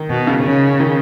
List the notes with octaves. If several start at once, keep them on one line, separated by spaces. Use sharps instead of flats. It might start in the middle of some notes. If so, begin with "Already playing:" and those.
Already playing: D#3
B2
C#3
C#3
D#3